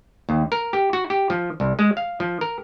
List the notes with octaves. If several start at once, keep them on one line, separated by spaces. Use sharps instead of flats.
D#2
A#4
G4
F#4
G4
F3
C2
G#3
F5
F3
A#4